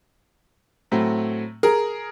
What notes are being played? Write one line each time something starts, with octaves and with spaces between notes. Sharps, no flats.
A2 F#3 A3 C4
G#4 A#4